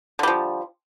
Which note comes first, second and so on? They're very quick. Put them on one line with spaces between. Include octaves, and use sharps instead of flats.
D3 G3 F3